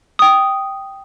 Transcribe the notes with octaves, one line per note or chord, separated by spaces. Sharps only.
G5 D#6